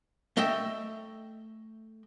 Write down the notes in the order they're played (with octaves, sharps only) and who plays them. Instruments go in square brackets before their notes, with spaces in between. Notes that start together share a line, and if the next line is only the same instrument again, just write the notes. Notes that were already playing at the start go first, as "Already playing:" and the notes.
[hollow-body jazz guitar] A3 D#5 E5 G5